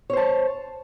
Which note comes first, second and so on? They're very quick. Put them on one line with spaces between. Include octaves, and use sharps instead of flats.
C#5 C5 A5